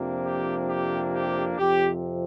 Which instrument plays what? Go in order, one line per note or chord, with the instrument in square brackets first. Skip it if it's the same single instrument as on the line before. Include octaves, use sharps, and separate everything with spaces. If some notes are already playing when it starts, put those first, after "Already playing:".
Already playing: [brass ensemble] F2 C3 F3 A#3 D4
G4
G4
G4
F2 C3 F3 G4